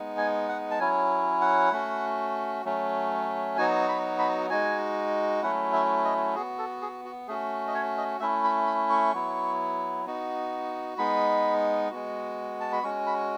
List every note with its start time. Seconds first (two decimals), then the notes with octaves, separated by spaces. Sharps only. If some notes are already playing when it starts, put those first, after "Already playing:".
Already playing: G#3 B3 D#4
0.18 G#5
0.49 F#5
0.71 A5
0.79 F#3 C#4 E4 G#5
1.41 F#5
1.72 A3 C#4 F#4
2.65 F#3 A3 C#4
3.57 F#3 B3 D#4 F#4 G#5
3.88 B5
4.19 B5
4.50 G#3 D#4 F#4 G#5
5.42 F#3 A3 C#4 E4 F#5
5.73 E5
6.05 D#5
6.35 F#4 G#4
6.38 B3
6.58 A4
6.81 G#4
7.05 F#4
7.27 A3 C#4 F#4 G#4
7.67 D#5
7.74 C#5
7.97 D#5
8.20 A3 C#4 E4 E5
8.44 B5
8.67 B5
8.90 C#6
9.14 F#3 B3 E4
10.06 B3 D#4 F#4
10.98 G#3 B3 D#4 B5
11.91 G#3 B3 F#4
12.60 A5
12.72 B5
12.83 G#3 C#4 F#4 C#6
13.07 B5